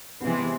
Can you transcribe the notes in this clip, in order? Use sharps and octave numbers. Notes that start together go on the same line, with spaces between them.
C3 E3 G#3 B3 C4 B4